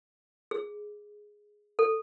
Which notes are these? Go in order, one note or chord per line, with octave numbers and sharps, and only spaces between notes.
G#4
A4